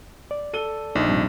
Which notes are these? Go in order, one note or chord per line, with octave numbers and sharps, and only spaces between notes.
D5
A4 D#7 G7
A#1 D4 D#4
G2 C3